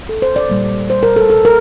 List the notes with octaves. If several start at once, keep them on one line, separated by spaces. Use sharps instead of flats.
A4
C5
D5
A#2 G3 A#3
C5
A#4
A4
A4
A#4